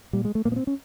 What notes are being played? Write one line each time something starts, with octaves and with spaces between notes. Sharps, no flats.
A#2 G3
G#3
A3
A#2 A#3
B3
C4
C#4